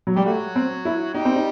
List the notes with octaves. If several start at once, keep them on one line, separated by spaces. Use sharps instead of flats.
F#3
G3 G4
F#3 A3 F#4
C4
E4
G3 D#4 G4
C4
D#4